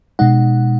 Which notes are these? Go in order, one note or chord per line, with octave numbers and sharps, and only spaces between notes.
B2 G#3 D#4 F#5